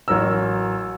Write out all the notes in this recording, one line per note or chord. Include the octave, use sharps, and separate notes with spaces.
A1 F#3 A#4 A#5 E6